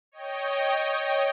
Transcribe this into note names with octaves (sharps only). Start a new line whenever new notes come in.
C#5 D#5 G5